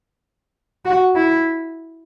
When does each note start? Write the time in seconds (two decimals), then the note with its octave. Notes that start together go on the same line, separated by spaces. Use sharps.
0.85 F#4
1.16 E4